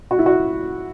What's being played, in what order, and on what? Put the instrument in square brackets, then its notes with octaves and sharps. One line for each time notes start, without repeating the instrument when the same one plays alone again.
[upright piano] F#4
E4
F#4